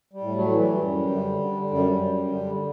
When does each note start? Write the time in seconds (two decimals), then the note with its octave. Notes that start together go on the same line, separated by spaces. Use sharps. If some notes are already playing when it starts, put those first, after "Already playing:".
0.13 G3
0.21 A2
0.36 F#3 A3
0.51 E3
0.58 G3
0.81 F#2
1.11 D3
1.40 D3
1.70 F#2 G3
2.00 F#2
2.29 D3